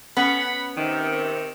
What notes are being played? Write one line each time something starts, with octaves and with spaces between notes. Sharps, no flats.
B3 C#4 F#5 B5
C3 D#3